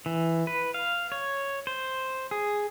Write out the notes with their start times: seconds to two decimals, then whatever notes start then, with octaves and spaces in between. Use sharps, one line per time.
0.06 E3
0.47 B4
0.74 F5
1.12 C#5
1.67 C5
2.31 G#4